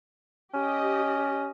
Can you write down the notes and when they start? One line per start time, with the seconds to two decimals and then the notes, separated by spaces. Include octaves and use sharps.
0.54 C#4 G4 D#5